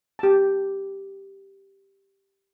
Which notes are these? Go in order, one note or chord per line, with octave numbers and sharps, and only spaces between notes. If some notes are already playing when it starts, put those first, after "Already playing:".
G4 A5